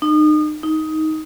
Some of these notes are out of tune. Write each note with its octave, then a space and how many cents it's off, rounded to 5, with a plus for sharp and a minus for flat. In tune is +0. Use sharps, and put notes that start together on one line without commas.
D#4 -35
D#4 +10